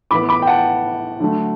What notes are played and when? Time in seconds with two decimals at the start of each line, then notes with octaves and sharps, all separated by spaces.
0.11 A2 E3 B3 B5 D6
0.29 B5 D6
0.42 G5
0.47 F#5 A5
1.20 D3 F#3 A3